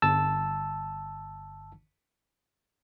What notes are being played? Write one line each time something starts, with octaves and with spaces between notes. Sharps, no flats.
G1 A5 E6